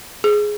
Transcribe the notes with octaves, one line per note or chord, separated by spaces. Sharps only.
G#4